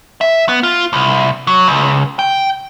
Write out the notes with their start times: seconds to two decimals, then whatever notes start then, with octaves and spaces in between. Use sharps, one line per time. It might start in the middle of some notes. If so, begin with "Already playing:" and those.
0.21 E5
0.49 B3
0.63 F4
0.93 C2
1.47 F#3
1.68 C#2
2.19 G5